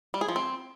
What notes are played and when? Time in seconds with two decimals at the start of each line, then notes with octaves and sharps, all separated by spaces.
0.14 G3
0.21 G#4
0.28 F3
0.36 C4